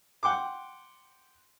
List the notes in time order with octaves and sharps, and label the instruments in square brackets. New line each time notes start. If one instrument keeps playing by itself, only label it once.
[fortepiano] F#5 G5 C6 D6